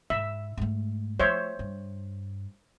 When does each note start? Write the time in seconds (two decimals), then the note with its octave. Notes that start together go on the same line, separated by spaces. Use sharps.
0.10 G#2 E5
0.57 G#2 A3
1.20 F3 A3 C5 C#5 E5
1.59 G2